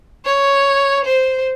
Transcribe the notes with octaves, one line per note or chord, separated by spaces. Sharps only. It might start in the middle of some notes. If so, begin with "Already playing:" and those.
C#5
C5